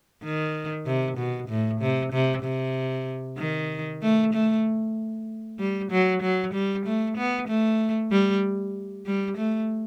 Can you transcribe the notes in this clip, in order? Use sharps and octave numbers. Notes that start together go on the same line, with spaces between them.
D#3
C3
B2
A2
C3
C3
C3
D#3
A3
A3
G3
F#3
F#3
G3
A3
B3
A3
G3
G3
A3